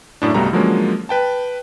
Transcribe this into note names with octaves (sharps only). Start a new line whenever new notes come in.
F#2 A2 D4
C2 G2 B2 G3 A3 A#5
D3 F3 F#3 G#3 A#3 C#4
B4 G5 A5